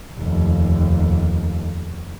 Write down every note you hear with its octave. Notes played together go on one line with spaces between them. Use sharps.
F1 D#2